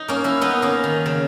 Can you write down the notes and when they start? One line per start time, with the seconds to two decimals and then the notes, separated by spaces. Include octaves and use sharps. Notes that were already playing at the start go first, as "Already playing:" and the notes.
Already playing: D#4
0.08 A#3 C#4
0.24 C#4 E4
0.41 B3 D#4
0.62 A#3 C#4
0.84 D#3
1.06 C#3